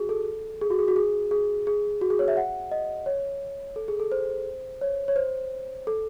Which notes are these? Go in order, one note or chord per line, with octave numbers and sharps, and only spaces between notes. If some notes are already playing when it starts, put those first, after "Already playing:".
Already playing: F#4 G#4
A4
G#4
F#4
G#4
F#4
G#4
G#4
G#4
F#4
G#4
C#5
E5
F#5
D#5
C#5
A4
G#4
A4
C5
C#5
C#5
C5
A4